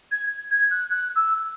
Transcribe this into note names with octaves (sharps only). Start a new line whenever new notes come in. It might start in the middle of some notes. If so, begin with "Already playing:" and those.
G#6
G#6
F#6
F#6
E6